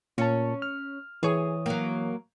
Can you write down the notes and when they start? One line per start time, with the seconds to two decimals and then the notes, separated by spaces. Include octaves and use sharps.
0.18 A#2 C#4 C#5 A5
0.62 F6
1.23 E3 G#4 C#5 D#6
1.66 F#3 A#3